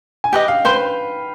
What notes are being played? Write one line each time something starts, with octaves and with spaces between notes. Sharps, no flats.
G#5
G4 B4 D#5 G5
F5
B4 C5 G5 C6